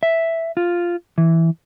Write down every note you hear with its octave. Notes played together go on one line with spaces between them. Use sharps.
E5
F4
E3